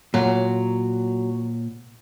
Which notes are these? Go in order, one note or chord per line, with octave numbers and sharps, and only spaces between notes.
A#2 F#3